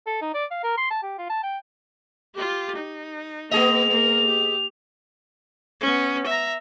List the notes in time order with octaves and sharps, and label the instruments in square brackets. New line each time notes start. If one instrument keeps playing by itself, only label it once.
[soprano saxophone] A4
D#4
D5
F5
A#4
C6
A5
G4
F4
A5
G5
[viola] F4 G4
D#4
[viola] A#3 [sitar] B3 G#4 D#5 [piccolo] F7
[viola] A#3 A#4
G4
B3 C#4
E5 A#5